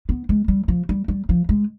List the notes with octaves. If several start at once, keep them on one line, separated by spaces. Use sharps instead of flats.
B3
G#3
G3
F3
G3
G3
F3
G#3